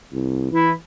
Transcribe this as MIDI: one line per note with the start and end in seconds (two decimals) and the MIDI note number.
0.13 0.51 36
0.52 0.73 52
0.52 0.71 64